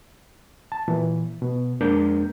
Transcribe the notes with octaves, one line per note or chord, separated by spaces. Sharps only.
A5
A#2 E3
B2
F2 G#3 A#3 D4 A#4 G6